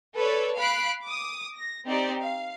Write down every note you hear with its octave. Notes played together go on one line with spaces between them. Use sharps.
A4 B4 C#5 D5
F5 B5 F#6 C7 D7
D6 D#6
A#6
C4 D#4 G4 C5 D5
F5